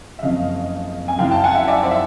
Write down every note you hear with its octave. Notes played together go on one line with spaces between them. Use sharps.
E5
F#1 F2 C#3 D#5 F5
G#5
F#2 C#3 E3 F5 G5
G5 A5
F#5 G#5
E5 F#5
D5 E5
C5 D5
E5